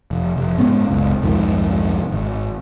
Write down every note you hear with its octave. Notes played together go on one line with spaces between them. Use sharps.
F1
F1
G#2 B3 C#4
F#1 C#2
C2 F2 G#2 D#3
G#1